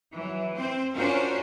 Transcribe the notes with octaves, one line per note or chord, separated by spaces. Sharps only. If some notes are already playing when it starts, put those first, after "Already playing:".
E3 F#3
C4 C5
C#4 D4 F4 F#4 A#4 C5